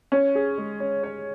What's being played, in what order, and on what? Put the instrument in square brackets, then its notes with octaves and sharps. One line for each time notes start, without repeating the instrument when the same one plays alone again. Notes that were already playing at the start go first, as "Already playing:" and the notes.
[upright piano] C#4 [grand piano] C#5
[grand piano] G#4
G#3
C#4
C#5